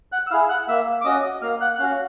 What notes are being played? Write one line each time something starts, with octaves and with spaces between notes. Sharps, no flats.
F#5 F#6
E6
E4 G#4 F5 F6
F#5 F#6
A#3 E5 E6
D6
C#4 F#4 D#5 D#6
A#3 F5 F6
F#5 F#6
F#6
C#4 F#4 F5 F6